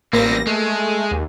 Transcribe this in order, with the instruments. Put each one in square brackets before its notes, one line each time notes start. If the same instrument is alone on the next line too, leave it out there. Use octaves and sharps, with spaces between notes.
[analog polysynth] A1 A#6 [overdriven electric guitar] G3 C4 [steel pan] A#3
[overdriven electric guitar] G#3 [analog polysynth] A3
[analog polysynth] D#2